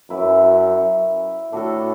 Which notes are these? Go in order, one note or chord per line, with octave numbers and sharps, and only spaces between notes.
F#2 E4 B4 E5
A2 D4 F#4 A4